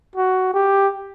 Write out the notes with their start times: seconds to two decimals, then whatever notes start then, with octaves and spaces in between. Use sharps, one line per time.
0.16 F#4
0.53 G4